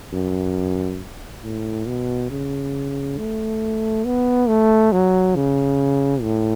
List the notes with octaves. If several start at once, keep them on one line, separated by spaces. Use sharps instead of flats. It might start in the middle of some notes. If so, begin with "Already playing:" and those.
F#2
A2
B2
C#3
A3
B3
A3
F#3
C#3
A2